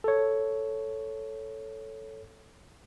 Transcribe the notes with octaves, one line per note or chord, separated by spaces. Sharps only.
A4 C#5